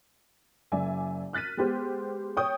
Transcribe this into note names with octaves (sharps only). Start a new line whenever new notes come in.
F#1 D5 E5 G#5
F6 F#6 A6 B6 D#7
G#3 B3 G4 C5
C#5 G5 C#6 D#6 G6